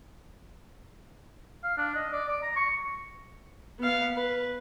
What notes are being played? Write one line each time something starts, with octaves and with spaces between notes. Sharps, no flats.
F5
D4
D#5
D5
D6
A#5
C#6
B3 F5
B4